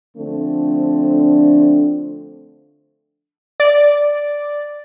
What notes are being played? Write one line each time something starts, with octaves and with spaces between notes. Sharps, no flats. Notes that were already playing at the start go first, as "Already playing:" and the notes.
D3 F3 A3 C4 D4
D5